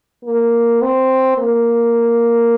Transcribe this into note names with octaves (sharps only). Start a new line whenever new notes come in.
A#3
C4
A#3